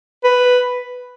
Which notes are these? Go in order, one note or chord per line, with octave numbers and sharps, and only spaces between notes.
B4